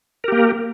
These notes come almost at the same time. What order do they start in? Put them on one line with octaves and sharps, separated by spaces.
A#4 G4 A#3